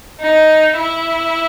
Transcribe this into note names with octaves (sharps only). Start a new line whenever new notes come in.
D#4
E4